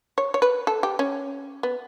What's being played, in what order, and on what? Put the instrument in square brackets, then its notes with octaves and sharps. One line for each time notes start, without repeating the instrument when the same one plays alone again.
[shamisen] C#5
C#5
B4
A4
G4
C#4
B3